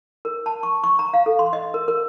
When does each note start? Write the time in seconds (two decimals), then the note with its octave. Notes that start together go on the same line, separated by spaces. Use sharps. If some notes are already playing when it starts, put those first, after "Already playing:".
0.25 A#4
0.46 A5
0.63 C#6
0.84 C#6
0.99 A#5
1.14 F5
1.26 A4
1.39 C6
1.53 D#5
1.74 A#4
1.88 A#4